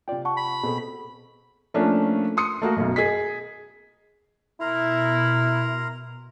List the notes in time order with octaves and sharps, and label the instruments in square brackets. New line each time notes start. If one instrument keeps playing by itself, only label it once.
[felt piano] C3 F4 [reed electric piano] D5 G5
[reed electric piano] F#5 [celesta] A5 C#6
[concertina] B5
[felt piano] B2 B3 C4 [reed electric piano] G#4 A4
[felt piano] F3 A3 A#3 C#4 D4
C6 D#6 C#7
A3 A#3 F#4
B1 F#2
G#4 D#5 B6
[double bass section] B2 [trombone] E4 [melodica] A#4 A#5 C6